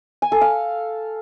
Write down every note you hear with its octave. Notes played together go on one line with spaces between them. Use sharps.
G#5
A4
F5